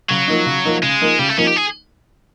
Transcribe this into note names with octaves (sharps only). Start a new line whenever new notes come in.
C#3 F#3
F3 A#3 D#4
C#3
F3 A#3 D#4
C#3 G#3
F3 A#3 D#4
C#3 G3
A3
F3 A#3 C#4 D#4
G4
G#4